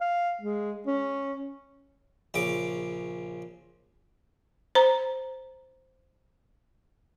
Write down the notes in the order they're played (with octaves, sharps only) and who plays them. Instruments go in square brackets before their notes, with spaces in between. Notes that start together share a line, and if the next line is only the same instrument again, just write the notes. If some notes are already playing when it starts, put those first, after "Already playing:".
[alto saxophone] F5
G#3
C#4
[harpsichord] A#1 C#3 D6
[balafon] C5 A#5